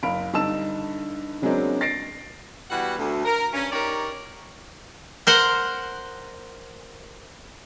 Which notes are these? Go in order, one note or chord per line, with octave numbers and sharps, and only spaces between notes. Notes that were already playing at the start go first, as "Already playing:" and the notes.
F#1 F5 B5 D7
G2 D3 D#4 A5 E6 E7
C#3 F#3 G#3 A#3 C4 D4
A6 A#6 C7 D7
E3 G3 B3 F#4 F#5
D2
A#4
G2 C#4
D#4 G4 A#4 C#5 D5
A#4 C5 F#5